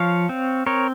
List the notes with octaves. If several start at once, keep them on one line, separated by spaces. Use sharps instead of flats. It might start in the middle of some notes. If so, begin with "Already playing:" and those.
Already playing: F3 C#5 F5
C4
C4 A#4 C#5